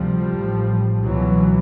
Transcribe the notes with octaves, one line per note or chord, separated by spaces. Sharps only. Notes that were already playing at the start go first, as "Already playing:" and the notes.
Already playing: D2 C3 F3 G3
A1 A2
C#2 B2 E3 F#3